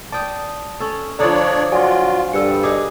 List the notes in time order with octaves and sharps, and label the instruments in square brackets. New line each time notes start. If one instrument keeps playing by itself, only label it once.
[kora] D5 G5 [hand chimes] A5 D#6
[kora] C#4 A4
[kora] D3 F3 [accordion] D4 C#5 D5 [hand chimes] A#5 D#6
[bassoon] F#3 [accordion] F4 [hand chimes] D5 G#5 C#6
[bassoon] G2 [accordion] G3 [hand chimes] A4 E6 C#7
[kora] D#4 G#4 [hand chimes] D6